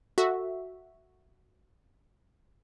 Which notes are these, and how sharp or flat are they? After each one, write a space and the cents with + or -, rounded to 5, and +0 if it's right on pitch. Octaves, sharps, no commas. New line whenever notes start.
F#4 +0 A4 +25 E5 +0